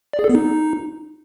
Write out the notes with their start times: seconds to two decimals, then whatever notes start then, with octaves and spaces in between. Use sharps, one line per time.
0.13 D5
0.19 G#4
0.24 A4
0.30 B3
0.35 D#4